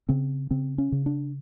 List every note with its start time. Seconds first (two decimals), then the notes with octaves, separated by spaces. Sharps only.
0.09 C#3 C4
0.51 C#3 C4
0.78 C#4
0.92 C#3
1.06 D4